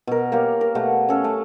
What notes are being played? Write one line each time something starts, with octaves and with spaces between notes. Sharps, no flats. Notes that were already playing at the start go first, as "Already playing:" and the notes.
B2 A#4
A#3 G4 C#5 F5
A#4
B2 A3 G4 F#5
C#4 A4 F5
A3 F5 D6